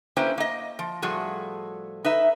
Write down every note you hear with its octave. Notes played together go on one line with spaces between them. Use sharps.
A#3 C#4 E4 B4 C5 G5
A#3 D#5
F3
A2 F3 G3 F#4 G#4
D#4 B4 E5